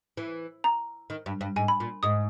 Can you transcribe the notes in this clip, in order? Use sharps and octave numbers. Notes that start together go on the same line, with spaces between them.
E3
A#5
D#3
G2
G2
G#2 G#5
B5
A#2
G#2 D#6